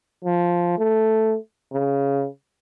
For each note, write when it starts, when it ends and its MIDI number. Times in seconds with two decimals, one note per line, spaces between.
0.25 0.76 53
0.78 1.36 57
1.72 2.27 49